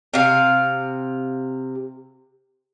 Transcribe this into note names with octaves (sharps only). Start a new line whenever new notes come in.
C3 F5